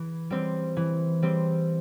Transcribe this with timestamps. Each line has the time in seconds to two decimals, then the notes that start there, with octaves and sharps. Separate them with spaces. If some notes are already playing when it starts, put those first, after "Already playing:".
Already playing: E3
0.30 G3 C4
0.77 E3
1.22 G3 C4